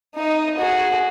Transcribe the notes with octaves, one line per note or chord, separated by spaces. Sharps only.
D#4 D#5
F#4 G#4